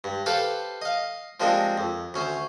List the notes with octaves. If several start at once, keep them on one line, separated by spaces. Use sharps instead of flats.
G2
G4 A4 B4 C5 F5
D#5 F5
F3 G3 G#3 A#3 C4 D4
F2
D2 C#4 C5